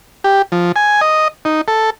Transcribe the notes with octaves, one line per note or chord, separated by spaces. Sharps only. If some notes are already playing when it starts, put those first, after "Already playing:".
G4
F3
G#5
D#5
D#4
A4